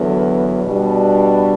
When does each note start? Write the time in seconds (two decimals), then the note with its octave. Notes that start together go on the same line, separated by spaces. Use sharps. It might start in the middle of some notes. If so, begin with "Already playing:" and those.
Already playing: E2 D3 F#3 B3
0.64 B2 G3 D4